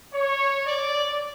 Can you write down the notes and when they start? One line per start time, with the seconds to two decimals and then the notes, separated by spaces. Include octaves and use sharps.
0.12 C#5
0.65 D5